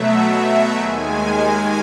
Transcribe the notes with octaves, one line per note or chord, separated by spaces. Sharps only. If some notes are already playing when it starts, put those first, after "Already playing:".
Already playing: B2 F#3 A3 E5
D#2 D#3 G#3 G#5